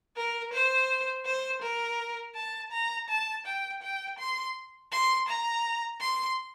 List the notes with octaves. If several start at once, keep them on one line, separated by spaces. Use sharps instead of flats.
A#4
C5
C5
A#4
A5
A#5
A5
G5
G5
C6
C6
A#5
C6